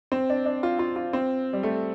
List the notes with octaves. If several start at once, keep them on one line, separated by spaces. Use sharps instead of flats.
C4
D4
D4
F4
F4
F4
C4
G3
A3